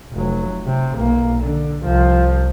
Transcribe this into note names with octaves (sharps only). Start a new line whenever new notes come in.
F1 F#3
C3
B1 A#3
D3
C2 F3